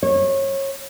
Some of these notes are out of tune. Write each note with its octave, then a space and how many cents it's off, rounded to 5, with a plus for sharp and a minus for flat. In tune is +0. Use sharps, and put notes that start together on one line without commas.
C#5 -25